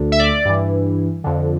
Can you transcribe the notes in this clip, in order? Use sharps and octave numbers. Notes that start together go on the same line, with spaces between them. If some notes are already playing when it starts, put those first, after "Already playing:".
Already playing: D2 D3
E5
D5
G2 E3
F2 D3